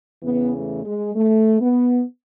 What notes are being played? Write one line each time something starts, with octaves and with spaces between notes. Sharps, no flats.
E2 C#3 E3 B3
A3
G#3
A3
B3